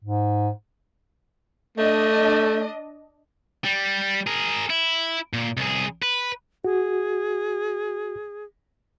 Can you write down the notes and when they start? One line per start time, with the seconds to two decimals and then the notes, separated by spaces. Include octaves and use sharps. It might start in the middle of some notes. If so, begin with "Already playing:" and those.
0.05 G#2
1.78 A3 D4 D#5
3.64 G3
4.27 G#4 A#4
4.70 E4
5.33 A#2
5.57 C2 G#4
6.02 B4
6.65 F#4 G#4